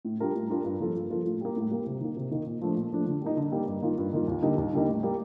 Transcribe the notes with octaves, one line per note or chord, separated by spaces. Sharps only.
A2
G3 D4 F4 A#4
A2
G3 D4 F4 A#4
G2
F3 A#3 F4 A4
G2
F3 A#3 F4 A4
A2
G3 A#3
A2
G3 A#3
C3
D#3 A#3
C3
D#3 A#3
A#2
F3 A3 D4
A#2
F3 A3 D4
D3
G3 A#3 D#4
D3
G3 A#3 D#4
G2
D#3 A#3 F4
G2
D#3 A#3 F4
D#2
D3 G3 A#3 D#4
D#2
D3 G3 A#3 D#4
A2
G3 A#3